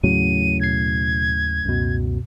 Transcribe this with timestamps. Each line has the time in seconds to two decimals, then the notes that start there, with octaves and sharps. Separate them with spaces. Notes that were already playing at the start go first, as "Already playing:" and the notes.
0.03 D#2 A2 C#3 F#3 D#7
0.61 B2 G#6 C7
1.65 C#2 F#2 B2